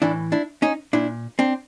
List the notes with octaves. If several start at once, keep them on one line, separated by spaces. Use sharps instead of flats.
A2 E3 D4 E4
D4 E4
C#4 D#4
A#2 D4 E4
C4 D4